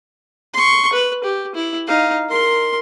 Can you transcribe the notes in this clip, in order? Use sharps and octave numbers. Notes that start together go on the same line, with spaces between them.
C6 C#6
B4
G4
E4
D#4 F5
A#4 C6